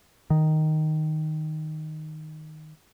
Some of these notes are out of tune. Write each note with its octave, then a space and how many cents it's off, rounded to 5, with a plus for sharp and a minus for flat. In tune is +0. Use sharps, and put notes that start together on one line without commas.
D#3 +0